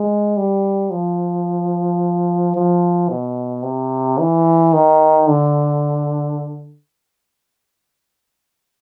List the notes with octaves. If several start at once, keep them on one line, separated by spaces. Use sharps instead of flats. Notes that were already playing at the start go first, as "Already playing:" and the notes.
Already playing: G#3
G3
F3
F3
B2
C3
E3
D#3
D3